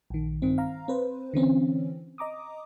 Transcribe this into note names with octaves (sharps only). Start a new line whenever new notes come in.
A#1 D#3
G2 D#3 C4
F5 A#5
C4 B4 C5
D3 E3 C4 C#4
D#5 A#5 D6 D#6